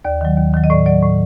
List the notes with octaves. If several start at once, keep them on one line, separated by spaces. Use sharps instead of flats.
D#2 D5
D#3 F#3
D#2
D#3 F#3
D#5
A2 D5
F#3 D5
A2